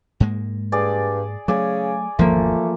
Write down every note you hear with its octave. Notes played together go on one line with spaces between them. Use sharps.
G#2 G#3 A#3
G2 G#4 D5 G#5
C#3 F#3 A3 D5 G#5
G#1 E2 D3 F3 A3 A#3